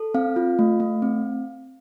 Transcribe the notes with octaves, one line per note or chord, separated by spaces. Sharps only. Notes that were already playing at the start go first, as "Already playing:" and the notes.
Already playing: A4
C4 F5
F4
A3
A3
C4